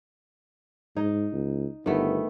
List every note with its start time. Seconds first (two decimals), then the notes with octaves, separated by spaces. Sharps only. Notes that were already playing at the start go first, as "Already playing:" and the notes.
0.97 G#2 D#4
1.33 C#2
1.86 G1 D#3 A3 B3